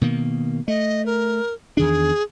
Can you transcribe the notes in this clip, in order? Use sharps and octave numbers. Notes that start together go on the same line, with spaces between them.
B2 D#3 A#3
A3 D#5
A#4
E2 D#3 D4 G#4